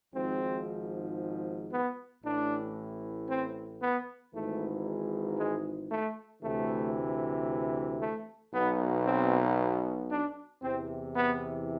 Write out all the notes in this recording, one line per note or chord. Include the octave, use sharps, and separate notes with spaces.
G#1 G#2 F3 C4
B3
A1 A2 E3 D4
C4
B3
G#1 G#2 E3 A3
G#3
A3
D2 C3 E3 A3
A3
B1 B2 B3
C4
D4
E2 C3 E3 C4
B3